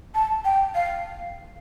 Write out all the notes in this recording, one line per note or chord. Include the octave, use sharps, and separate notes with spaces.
A5
G5
F5